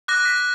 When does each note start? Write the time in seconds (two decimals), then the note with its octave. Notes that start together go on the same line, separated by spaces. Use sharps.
0.08 D6 F#6 A#6
0.25 B6